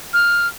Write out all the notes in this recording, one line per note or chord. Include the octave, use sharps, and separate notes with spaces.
F6